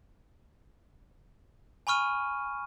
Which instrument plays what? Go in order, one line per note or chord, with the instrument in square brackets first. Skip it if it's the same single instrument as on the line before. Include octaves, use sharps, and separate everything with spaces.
[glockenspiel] G#5 B5 C#6 F6 D#7